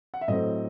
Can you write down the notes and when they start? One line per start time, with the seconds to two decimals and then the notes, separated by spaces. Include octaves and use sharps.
0.14 F#5
0.21 E5
0.28 A2 F#3 A3 C4 D#5